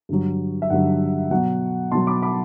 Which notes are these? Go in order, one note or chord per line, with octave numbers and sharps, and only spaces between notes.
G2 D3 F#3
E5
G2 D3 F#3 F#5
B2 F#3 F#5
B2 F#3 A5 C6
B5 D6
B5 D6